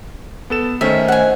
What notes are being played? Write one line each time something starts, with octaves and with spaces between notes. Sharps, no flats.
B3 A4 E7
D#3 A3 C#4 C5 D#5 E5
F#5 G#5